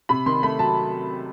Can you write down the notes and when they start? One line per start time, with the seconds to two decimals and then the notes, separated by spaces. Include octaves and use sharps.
0.09 C3 B5
0.26 D#3 C6
0.43 A3 B5
0.59 F#3 A5